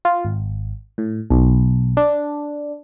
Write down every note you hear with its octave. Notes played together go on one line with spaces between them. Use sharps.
F4
G#1
A2
B1
D4